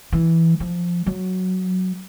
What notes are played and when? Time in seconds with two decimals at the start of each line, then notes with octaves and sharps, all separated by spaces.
0.13 E3
0.60 F3
1.06 F#3